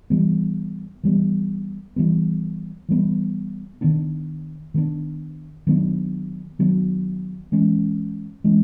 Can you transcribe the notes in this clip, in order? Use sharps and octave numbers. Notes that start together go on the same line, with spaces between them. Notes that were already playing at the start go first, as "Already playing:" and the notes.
E3 G3 B3
E3 G3 B3
E3 G3 B3
E3 G3 B3
D#3 F#3 B3 D4
D#3 F#3 B3 D4
D#3 F#3 B3 D4
D#3 F#3 B3 D4
E3 G#3 C#4
E3 G#3 C#4